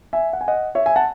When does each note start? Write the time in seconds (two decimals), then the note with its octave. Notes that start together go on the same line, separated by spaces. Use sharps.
0.13 E5 G#5
0.33 F#5
0.41 G#5
0.48 D#5 F#5
0.75 C#5 E5
0.86 E5 G#5
0.96 F#5 A5